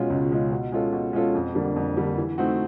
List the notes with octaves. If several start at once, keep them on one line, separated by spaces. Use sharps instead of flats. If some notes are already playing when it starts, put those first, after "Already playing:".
Already playing: B2 G#3 C#4 F4
C#2
B2 G#3 C#4 F4
B2
G#3 C#4 F4 A4
B2
G#3 C#4 F4 A4
F2
D3 G3 A#3 D4
F2
D3 G3 A#3 D4
E3
A3 C4 D#4 F#4